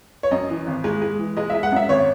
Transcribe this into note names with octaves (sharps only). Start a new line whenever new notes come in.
C#5
F#2 D#5
E3
G#1
G#3
G#3
E3
G#3 D#5
G#3 E5
F#5
F#2 E5
G#1 C#5